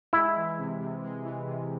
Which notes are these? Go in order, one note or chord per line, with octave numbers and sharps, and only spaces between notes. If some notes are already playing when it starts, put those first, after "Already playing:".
G#3 E4
E3
C3
C3
G#3
E3
C3